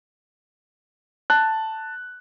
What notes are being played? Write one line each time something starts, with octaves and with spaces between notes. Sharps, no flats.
A5 F#6